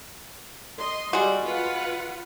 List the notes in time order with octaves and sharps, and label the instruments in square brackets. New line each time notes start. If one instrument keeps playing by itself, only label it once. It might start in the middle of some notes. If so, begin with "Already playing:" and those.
[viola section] D#5 C6
[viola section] G3 [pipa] G#3 F#4
[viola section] F4 B4 F#5